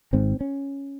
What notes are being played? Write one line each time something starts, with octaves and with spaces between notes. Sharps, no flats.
G#1 G#2 C4
C#4